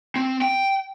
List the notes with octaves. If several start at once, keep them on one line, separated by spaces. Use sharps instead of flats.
C4
G5